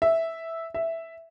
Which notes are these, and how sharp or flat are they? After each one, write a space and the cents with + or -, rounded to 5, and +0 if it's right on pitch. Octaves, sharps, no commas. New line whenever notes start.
E5 -5
E5 +0